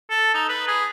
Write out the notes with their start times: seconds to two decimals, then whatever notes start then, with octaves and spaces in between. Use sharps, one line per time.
0.10 A4
0.35 D#4
0.49 B4
0.68 G#4